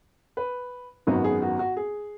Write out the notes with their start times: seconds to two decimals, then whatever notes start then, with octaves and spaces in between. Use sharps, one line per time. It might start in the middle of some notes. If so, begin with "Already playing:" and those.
0.37 B4
1.07 G#1 F#2 D#3 B3 F#4
1.24 G#4
1.42 F#4
1.59 F#4
1.77 G#4